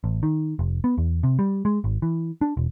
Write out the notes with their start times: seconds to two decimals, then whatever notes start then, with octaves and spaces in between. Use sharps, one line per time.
0.04 A1
0.23 D#3
0.59 F1
0.84 B3
0.98 E2
1.23 C3
1.39 G3
1.65 G#3
1.84 G#1
2.02 E3
2.41 D4
2.57 E1